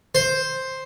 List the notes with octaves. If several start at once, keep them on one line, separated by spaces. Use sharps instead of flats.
C5